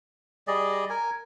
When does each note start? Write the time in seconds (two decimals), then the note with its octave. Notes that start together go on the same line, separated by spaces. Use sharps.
0.47 G3 G#4 D5 D#5
0.90 A#4 G#5